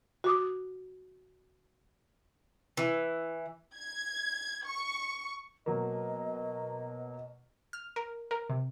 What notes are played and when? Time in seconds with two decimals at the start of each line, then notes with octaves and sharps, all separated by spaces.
0.24 F#4 D6 D#6
2.77 E3
3.76 G#6
4.66 C#6
5.66 B2 F#3 A#3 D#5
7.73 F6
7.96 A#4
8.31 A#4
8.49 C3